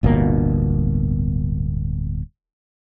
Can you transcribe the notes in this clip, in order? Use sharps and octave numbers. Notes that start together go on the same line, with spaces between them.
D1 G1 B2 A#3